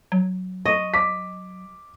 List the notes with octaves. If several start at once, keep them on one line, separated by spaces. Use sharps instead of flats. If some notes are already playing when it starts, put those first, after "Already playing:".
F#3
D#5 C#6
D6 B6